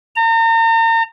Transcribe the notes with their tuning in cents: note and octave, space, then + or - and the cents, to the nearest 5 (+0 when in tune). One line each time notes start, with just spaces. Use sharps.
A#5 -40